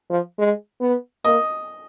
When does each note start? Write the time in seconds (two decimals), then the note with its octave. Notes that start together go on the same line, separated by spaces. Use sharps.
0.11 F3
0.39 G#3
0.81 B3
1.25 A#3 D#5